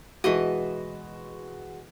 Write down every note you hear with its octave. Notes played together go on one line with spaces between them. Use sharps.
B2 E3 G#3 F#4 D#5